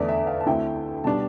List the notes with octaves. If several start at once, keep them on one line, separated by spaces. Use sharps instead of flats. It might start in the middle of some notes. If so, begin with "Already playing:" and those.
Already playing: E2 D3 A3 D5
E5
F5
A5
D2 D3 A3 C4 E4 G5
B2 G3 D4 A5